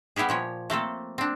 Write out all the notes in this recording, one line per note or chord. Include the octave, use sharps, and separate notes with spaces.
G3 B3 E4 G4 G#4
A#2 F3 C#5
A3 A#3 C4 A4
C4 D4